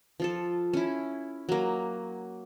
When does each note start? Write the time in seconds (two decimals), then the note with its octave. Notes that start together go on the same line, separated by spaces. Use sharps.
0.20 F3 F4 A4
0.73 C#4 E4
1.49 F#3 A#3